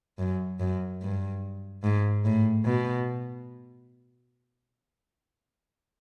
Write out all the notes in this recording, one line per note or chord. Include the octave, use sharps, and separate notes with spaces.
F#2
F#2
G2
G#2
A2
B2